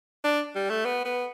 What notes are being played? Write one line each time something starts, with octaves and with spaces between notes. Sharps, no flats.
D4
G3
A3
B3
B3